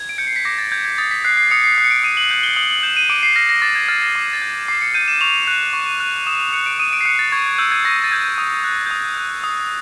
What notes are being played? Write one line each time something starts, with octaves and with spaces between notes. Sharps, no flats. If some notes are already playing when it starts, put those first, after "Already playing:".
Already playing: G#6
D7
G6 C#7
C7
B6
D6 A#6
A6
G6 G#6
G#6
D#6 A6
B6
F#6 C7
C7
D#6 C#7
C7
F#6 C7
C#7
D7
D#6 D#7
F#7
G6 F#7
G7
D#6 F#7
F#7
G6 E7
D#7
D6 D7
C7
F6 A#6
A#6
D6 A6
G#6
F6 A6
A#6
D6
A6
G6
A#6
D6 C7
C#7
G6 D#7
E7
C#6 F7
F#6
C#6
F#6
D#6 E7
F7
F#6 C#7
D7
D#6 D#7
D7
C7
F#6 C#7
A6
C#6 G#6
G#6
E6 G6
G#6
C#6 A#6
A6
E6 G6 G#6
G6
D#6
F#6
G6
D#6 G#6
F#6
D#6